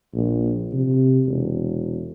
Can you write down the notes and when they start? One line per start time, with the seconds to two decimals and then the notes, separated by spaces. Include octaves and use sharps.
0.14 A#1
0.73 C3
1.26 E1